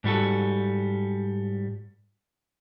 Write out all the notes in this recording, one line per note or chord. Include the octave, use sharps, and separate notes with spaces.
G#2 G3 F#4 A4